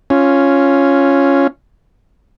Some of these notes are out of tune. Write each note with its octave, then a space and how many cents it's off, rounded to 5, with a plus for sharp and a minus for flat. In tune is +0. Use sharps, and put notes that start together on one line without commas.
C#4 +0 F4 -5